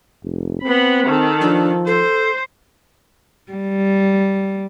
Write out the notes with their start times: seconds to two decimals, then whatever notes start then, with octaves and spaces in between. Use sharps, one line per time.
0.23 F1
0.62 B3 C4 B5
1.06 D#3 A4
1.41 F3 D4
1.87 A4 C5
3.52 G3